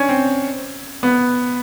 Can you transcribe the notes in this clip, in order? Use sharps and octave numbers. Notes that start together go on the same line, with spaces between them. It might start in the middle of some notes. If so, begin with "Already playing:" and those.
Already playing: C#4 D4
C4
B3